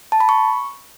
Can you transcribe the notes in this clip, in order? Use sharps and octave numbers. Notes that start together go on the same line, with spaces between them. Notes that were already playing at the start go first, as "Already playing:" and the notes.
A5
B5
C#6